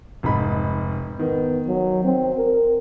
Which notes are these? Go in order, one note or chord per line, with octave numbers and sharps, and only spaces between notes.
F1 G#2 B5
D#3 B3
F#3
C4
A#4